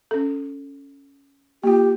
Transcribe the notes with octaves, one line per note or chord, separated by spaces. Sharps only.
C#4 A4
A#3 F4 G4